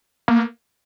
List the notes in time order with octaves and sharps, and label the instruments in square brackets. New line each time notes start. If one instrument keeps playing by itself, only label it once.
[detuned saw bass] A#3